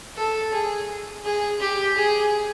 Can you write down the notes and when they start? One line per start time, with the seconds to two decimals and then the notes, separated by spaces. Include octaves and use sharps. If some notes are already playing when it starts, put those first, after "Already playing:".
0.16 A4
0.52 G#4
1.24 G#4
1.60 G4
1.96 G#4